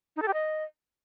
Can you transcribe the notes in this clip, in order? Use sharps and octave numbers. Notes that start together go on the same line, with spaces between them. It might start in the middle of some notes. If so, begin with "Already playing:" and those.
D#4
A4
G4
D#5